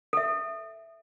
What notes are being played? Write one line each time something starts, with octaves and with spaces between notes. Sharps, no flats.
A4 E5